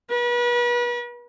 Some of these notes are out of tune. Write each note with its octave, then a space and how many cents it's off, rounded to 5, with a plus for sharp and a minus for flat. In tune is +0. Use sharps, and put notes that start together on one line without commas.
B4 -35